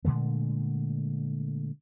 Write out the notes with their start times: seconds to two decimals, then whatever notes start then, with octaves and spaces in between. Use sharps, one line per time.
0.05 A#2 D3 G#3 A3